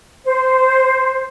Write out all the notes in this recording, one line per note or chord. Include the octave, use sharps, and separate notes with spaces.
C5